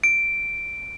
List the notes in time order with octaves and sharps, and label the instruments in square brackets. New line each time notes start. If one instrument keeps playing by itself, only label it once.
[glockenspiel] D7